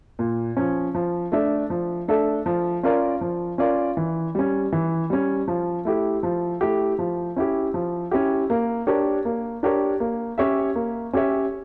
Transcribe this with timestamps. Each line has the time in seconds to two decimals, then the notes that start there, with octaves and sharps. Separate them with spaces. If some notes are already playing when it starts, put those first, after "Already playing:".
0.19 A#2
0.57 F3 C#4
0.95 F3
1.32 A3 D4 A4 E5
1.70 F3
2.08 A3 D4 A4 E5
2.46 F3
2.83 C#4 F4 A#4 D5
3.21 F3
3.58 C#4 F4 A#4 D5
3.97 E3
4.35 G3 C#4
4.72 E3
5.10 G3 C#4
5.48 F3
5.85 A3 E4 G4
6.23 F3
6.61 A3 E4 G4
6.99 F3
7.36 C#4 E4 G4
7.74 F3
8.11 C#4 E4 G4
8.50 A#3
8.87 D4 G4 A#4 C#5
9.25 A#3
9.63 D4 G4 A#4 C#5
10.00 A#3
10.38 C#4 G4 C#5 E5
10.75 A#3
11.13 C#4 G4 C#5 E5